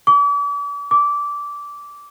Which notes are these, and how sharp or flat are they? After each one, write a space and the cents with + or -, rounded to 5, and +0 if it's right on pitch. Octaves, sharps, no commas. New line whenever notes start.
D6 -40
D6 -15